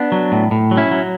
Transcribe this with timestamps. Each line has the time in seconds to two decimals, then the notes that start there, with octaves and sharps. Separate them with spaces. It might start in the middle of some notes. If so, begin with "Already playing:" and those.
Already playing: B3 D4
0.12 F#3
0.32 A2
0.51 A2
0.71 F#3
0.77 C#4 E4
0.91 F#3